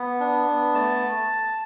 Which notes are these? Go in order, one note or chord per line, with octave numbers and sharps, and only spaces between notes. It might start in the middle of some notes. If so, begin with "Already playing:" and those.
Already playing: B3
D4
B3
A3 A5